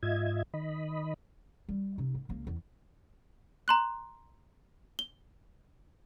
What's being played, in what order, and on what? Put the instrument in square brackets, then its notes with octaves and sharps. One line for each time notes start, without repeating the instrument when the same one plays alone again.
[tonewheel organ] G#2 F4 D#5 E5 G#6
D#3 D#5 B5
[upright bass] G3
C3 D#4
G#2
C#2 A#3
E2
[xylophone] A#5 C6 F#6
G7